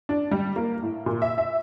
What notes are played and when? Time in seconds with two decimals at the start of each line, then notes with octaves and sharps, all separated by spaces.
0.09 D4
0.31 G3
0.56 A#3
0.82 A2
1.06 A#2
1.22 E5
1.38 E5